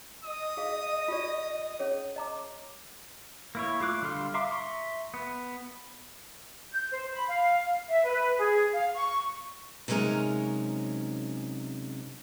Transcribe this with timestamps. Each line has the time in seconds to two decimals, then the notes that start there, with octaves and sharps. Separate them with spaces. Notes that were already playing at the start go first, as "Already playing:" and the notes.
0.24 D#5 D#6
0.57 G#4 F5
1.08 F4 G4 D5
1.79 C#4 G#4 C#5
2.16 D#5 A#5 D6
3.55 A#3 E4 C#5
3.80 A3 F4 D6 F#6
4.02 D3 G3 F5 C6 F6
4.34 E5 F5 A#5 C6 D6
4.51 E5 A#5 C6 C#6
5.14 B3
6.72 G6
6.92 C5
7.13 B5
7.29 F5
7.89 E5
8.05 B4
8.38 G#4
8.73 F5
8.95 C#6
9.88 C3 F#3 G#3 C#4 D#4 A#4